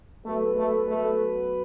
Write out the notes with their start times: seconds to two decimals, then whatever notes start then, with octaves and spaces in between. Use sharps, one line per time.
0.25 F#3 A3 B3 F#4 B4
0.56 A3
0.88 A3